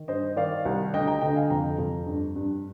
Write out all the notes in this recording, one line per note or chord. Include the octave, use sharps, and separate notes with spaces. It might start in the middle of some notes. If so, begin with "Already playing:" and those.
Already playing: D#3
G2 C5 D#5
D#3 D5 F5
C2
D2 D#5 G5
G5 A#5
D3 D#5 G5
F5 G#5
F2 G5 A#5
F2
G2
G2